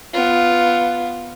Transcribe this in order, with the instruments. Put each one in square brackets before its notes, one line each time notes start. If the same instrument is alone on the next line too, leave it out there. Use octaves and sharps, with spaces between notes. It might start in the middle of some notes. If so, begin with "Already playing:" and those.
[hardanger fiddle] B3 F4